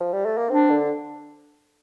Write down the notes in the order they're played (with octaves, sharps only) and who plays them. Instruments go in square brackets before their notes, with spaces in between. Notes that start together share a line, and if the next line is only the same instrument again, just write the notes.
[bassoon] F3
G3
A3
A#3
[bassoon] C4 [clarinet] D4
[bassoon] D3